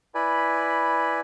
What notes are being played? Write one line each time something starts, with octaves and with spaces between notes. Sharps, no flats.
E4 B4 D5 G#5 B5